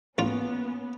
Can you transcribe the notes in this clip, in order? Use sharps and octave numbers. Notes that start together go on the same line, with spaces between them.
A1 A#3 B3 C#4 F4